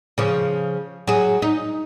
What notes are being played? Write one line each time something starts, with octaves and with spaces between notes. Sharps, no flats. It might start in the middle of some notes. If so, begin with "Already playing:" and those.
C#3 F3
F#3 G#4
D#4